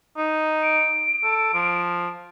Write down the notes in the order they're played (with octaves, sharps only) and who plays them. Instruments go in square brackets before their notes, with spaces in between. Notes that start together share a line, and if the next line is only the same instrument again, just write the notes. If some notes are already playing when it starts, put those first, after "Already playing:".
[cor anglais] D#4
[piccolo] D7
[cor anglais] A4
F3